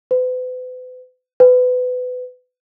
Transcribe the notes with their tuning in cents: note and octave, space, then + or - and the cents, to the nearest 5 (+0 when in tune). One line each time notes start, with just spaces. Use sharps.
B4 +40
B4 +25